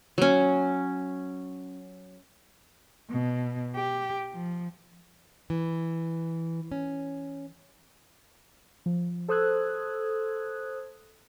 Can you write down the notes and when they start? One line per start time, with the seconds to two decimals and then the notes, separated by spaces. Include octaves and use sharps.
0.18 F#3 C#4
3.10 B2
3.76 G4
4.32 F3
5.50 E3
6.72 C#4
8.86 F3
9.28 A4 C5 D#6 E6 F#6 G#6